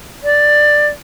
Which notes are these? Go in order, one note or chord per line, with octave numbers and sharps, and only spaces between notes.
D5